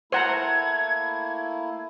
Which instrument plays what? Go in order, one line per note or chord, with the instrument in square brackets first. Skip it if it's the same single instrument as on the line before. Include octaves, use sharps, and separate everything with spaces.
[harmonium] A3 A#3 E4 [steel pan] C5 F#5 A#5 [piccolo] G#6